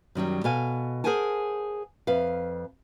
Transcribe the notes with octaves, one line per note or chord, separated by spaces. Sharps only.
F#2 D#3 F#3 G3
B2 A4 F5 G#5
G#4 A#4 C5 F#5 G#5 A5
F2 B4 F5